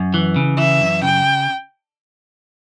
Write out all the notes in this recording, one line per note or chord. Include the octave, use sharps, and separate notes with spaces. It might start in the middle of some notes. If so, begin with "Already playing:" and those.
Already playing: F#2
E3
C#3
E3 E5
F#2
C#3 G5